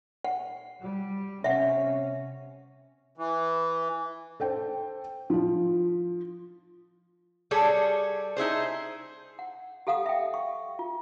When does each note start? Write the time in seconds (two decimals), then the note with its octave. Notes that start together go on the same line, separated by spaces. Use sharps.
0.24 F#5
0.81 G3
1.44 C3 C#4 E5 F#5
3.18 E3
4.40 A4 C5 G5
5.30 F3 F4
7.51 G3 G#4 A4 C#5
8.37 D#4 E4 G#4 C5
9.39 F#5
9.87 G4 A4 F5 F#5 D#6
10.06 E5 G5
10.34 C#6
10.79 F4